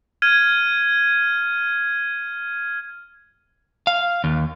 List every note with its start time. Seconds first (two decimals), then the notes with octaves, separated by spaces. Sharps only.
0.22 F6 G#6 D#7
3.87 F5
4.24 D#2